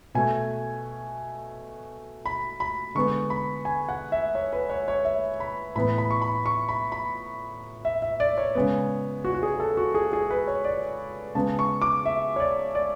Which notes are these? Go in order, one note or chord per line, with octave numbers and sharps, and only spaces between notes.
B2 A3 G#5
B5
B5
D3 G#3 B3 C#6
B5
G#5
F#5
E5
C#5
B4
C#5
C#5
E5
B5
A2 E3 B3 B5
B5
C#6
B5
C#6
B5
B5
E5
E5
D5
C#5
C#3 G#3 B3
F#4
F#4
G#4
A4
F#4
G#4
G#4
B4
C#5
D5
C#3 G#3 B3 A5
C#6
D6
E5
C#5
D5
D5